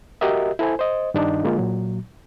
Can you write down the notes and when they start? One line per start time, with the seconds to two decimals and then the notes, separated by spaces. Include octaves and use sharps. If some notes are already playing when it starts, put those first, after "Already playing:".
0.21 F#4 G4 A#4 D#5 E5
0.59 E4 A4 C5 G#5
0.79 C5 D#5
1.14 G2 D#3 D4 D#4
1.44 D3 G#3 A#3 F4
1.58 A#2 F#3